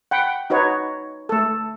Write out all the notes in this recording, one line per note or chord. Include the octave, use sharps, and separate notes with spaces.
F#5 G5 B5
D#4 F#4 B4 C#5
A3 A4